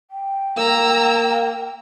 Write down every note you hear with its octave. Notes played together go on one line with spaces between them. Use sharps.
G5
A#3 A#5 E6